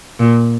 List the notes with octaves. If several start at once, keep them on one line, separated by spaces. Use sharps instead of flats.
A#2